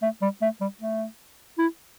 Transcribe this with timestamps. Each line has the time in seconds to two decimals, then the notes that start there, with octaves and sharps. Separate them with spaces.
0.02 A3
0.22 G3
0.42 A3
0.61 G3
0.81 A3
1.58 E4